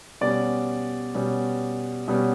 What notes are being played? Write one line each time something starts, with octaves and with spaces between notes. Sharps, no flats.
B2 G3 C#4 D5
B2 G3 C#4
B2 G3 C#4